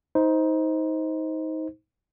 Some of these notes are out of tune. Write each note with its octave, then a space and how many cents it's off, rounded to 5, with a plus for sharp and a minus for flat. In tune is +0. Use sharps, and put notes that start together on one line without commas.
D#4 +25 C5 -5